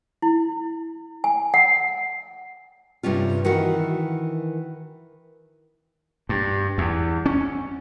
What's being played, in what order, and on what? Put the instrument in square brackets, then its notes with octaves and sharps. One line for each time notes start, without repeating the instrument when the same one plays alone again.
[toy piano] E4
G#5
F#5
[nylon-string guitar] G2 C3 G3 C#4 F4
D#3 E3 F#4 F#5
[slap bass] G2
E2
C#4